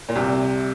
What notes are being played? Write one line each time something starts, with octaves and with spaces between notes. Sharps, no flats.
A#2
C2 C3